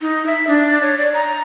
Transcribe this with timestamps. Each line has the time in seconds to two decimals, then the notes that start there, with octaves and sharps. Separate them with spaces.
0.01 D#4
0.26 E5
0.47 D4
0.82 C#5
0.98 D5
1.14 A#5